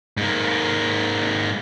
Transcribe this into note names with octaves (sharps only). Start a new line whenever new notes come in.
G#2 A#3